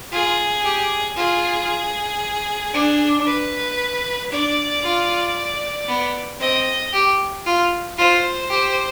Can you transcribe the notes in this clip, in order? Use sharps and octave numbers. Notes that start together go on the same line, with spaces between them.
F4 G#4
G4
F4 G#4
D4
B4
D4 D5
F4
B3
C4 D#5
G4
F4
F4 C5
G4